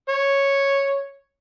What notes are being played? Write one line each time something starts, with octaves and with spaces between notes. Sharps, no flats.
C#5